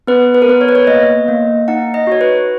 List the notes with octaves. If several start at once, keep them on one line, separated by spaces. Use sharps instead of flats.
B3 B4
B4
A#4
B3 B4
C#5
B4
C#5
A#3 D#5
A#3
D#4 F#5
D#5
F#4 C#5
B4